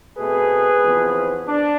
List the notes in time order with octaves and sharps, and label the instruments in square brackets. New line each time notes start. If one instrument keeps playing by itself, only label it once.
[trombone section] B2 A3 C4 G#4 B4
E2 C3 F3
D4